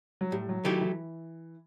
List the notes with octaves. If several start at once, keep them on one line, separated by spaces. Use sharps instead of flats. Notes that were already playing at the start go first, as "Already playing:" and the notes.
F#3
A2 G3
F#3
D#3 F#3 A3 E4 G4
E3